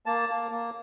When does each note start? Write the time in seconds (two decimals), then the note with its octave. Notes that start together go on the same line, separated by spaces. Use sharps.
0.06 A#3 A5
0.29 A#3
0.51 A#3